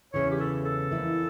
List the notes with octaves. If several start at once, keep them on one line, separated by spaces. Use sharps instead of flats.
E2 C#3 E3 C#5
G4
A4
A4
F2 E3 A#3 E4